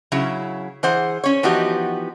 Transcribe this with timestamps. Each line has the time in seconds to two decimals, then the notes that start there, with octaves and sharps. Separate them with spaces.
0.12 C#3 F#3 E4
0.83 E3 G#4 C5 F#5
1.24 C#4 C#5
1.43 E3 F3 B3 D#4 F#4 G4